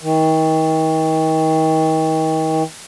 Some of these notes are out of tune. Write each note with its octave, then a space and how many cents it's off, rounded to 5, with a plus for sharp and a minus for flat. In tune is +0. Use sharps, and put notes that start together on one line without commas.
D#3 +35